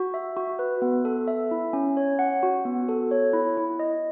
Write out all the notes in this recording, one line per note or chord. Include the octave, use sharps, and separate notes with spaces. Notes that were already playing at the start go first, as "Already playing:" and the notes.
Already playing: F#4
E5
F#4
B4
B3
A4
E5
E4
C#4
C#5
F#5
F#4
B3
A4
C#5
E4
E4
D#5